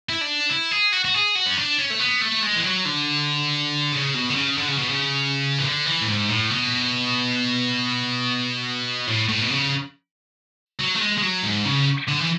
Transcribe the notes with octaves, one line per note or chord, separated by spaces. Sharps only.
E4
D4
E4
G#4
F#4
F#4
G#4
F#4
C#4
D4
C#4
A3
B3
A3
G#3
E3
F#3
D3
C#3
B2
D3
C#3
D3
C#3
B2
C#3
E3
D3
E3
A2
G#2
A2
B2
A2
A2
B2
C#3
F#3
A3
G#3
G#3
F#3
G#2
C#3
D3
E3